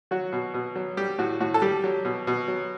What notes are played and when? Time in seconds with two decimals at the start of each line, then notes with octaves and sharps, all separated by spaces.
0.11 F#3 F#4
0.33 B2
0.54 B2
0.76 F#3
0.97 G3 G4
1.18 A2 F#4
1.41 A2 F#4
1.54 A4
1.62 G3 G4
1.84 F#3
2.05 B2
2.27 B2
2.48 F#3